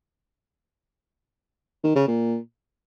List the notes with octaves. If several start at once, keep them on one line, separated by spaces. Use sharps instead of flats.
D#3
C#3
A#2